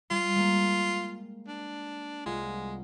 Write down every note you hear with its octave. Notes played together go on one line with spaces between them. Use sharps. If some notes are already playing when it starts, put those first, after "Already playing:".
G3 F4
G#3 A#3
D4
C2 G#3 F4 F#5